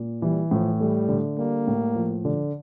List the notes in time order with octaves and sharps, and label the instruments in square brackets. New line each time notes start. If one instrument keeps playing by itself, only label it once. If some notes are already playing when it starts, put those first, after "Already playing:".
Already playing: [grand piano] A#2
[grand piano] E3 [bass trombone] G3
[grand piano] A2 [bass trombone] F3
[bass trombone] G3 [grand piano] A3
[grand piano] D3
[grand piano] G3 [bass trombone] A#3
[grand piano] A2
F3
D3